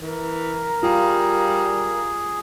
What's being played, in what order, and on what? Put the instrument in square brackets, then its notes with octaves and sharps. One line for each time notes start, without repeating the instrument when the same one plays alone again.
[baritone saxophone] E3 [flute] A#4
[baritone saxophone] G3 [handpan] F4 [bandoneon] G#4